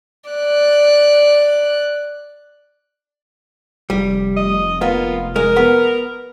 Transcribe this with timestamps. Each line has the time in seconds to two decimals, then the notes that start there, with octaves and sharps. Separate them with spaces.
0.31 D5 F#6
3.90 F1 G3
4.37 D#5
4.81 A#3 B3 F4
5.36 G#3 A#4
5.56 B3